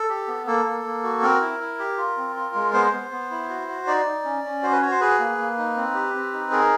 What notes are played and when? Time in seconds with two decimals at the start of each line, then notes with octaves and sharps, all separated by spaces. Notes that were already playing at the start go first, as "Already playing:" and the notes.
Already playing: A4
0.09 G4
0.28 B3
0.47 A#3 A4
0.65 A#3
0.84 A#3
1.04 F#4
1.22 C4 A#4
1.41 E4
1.60 E4
1.79 G4
1.98 F4
2.17 C4
2.36 F4
2.55 G#3
2.73 B3 C5
2.92 B3
3.11 B3
3.31 E4
3.49 F#4
3.68 F#4
3.87 D#4 D5
4.06 D#4
4.24 C#4
4.44 C#4
4.63 F#4 C5
4.72 B4
4.81 F#4 C#5
4.91 C5
5.00 G#4 B4
5.20 A#3
5.38 A#3
5.58 D#4
5.76 C4
5.94 G4
6.14 C4
6.33 D#4
6.51 G#4 A#4